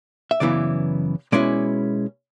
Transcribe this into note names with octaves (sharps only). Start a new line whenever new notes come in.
E5
F#2 C#3 E3 B3 E4 D5
B2 G#3 C#4 E4 D5